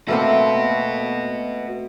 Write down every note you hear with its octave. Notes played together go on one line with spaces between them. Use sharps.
A3 A#3 C4 F#4 B4